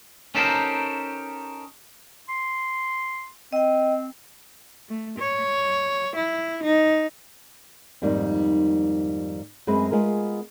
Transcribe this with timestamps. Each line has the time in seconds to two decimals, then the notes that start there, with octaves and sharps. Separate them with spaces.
0.35 C#4 D#4 G4 A4 A#4 C5
2.29 C6
3.53 C4 D#5 G5
4.89 A3
5.19 C#5
6.16 E4
6.63 D#4
8.02 F2 G#2 D#3 G3 A#3 D#4
9.67 F#2 G#3 C4 B4
9.91 G#3 B3 F4 G#4 A#4